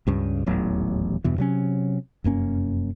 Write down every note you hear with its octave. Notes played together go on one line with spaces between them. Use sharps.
C#2 G2 C#3
D#1 A1 E2 F#3
E2 G2 B2 E3
C3 F#3 C#4
F1 F#2 A#3 C#4